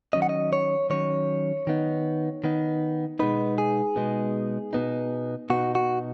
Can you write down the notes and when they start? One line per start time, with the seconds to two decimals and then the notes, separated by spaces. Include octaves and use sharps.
0.13 D#3 F#3 C#4 D#5
0.22 F#5
0.29 D#5
0.53 C#5
0.90 D#3 F#3 C#4 C#5
1.67 D#3 B3 D#4
2.44 D#3 B3 D#4
3.19 B2 G#3 B3 D#4 B4
3.58 G#4
3.96 B2 G#3 B3 D#4
4.73 B2 B3 D#4
5.50 B2 B3 D#4 F#4
5.75 F#4